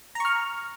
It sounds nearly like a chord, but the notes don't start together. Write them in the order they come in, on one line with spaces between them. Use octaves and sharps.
A#5 C#6 F6